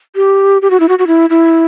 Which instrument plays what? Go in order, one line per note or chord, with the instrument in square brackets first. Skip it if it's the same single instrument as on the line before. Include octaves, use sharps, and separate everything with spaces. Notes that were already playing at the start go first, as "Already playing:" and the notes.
[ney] G4
G4
F#4
E4
F#4
F#4
E4
E4